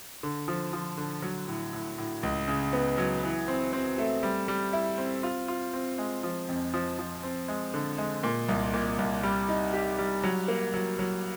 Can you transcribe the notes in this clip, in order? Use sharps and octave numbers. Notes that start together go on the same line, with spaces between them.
D3
F3
F3
D3
F#3
A2
A2
A2
C#2
C#3
B3
F#3
E3
C4
C4
A3
G3
G3
E4
C4
F4
F4
C4
G#3
F3
F2
F3
F3
C4
G#3
D3
G#3
A#2
C2
A#2
C2
G3
D#4
G4
G3
F#3
A#3
F#3
F#3